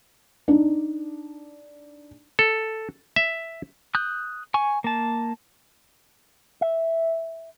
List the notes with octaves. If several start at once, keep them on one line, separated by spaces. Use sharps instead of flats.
D4 D#4
A4
E5
D#6 F#6 G6
G#5 C#6
A#3 A5
E5